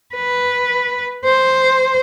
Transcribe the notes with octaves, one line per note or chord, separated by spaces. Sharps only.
B4
C5